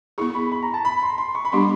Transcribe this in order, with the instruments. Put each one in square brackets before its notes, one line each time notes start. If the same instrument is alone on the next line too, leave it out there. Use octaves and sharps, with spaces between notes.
[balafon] B3 E4 G#4 [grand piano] C#6
[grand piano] B5
B5
A#5
A5
B5
C6
C6
C#6
B5
[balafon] G3 B3 D4 G4 [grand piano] C6